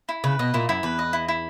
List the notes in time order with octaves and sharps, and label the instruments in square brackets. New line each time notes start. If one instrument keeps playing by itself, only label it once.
[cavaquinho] E4
[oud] C#3 [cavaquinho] B4
[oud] B2 [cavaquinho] D#5
[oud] A#2 [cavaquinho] E4
[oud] F#2 [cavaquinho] E4
[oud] E2 [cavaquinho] B4
[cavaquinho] D#5
E4
E4